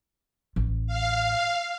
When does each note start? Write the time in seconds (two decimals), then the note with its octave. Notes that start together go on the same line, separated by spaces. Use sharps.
0.56 A1
0.87 F5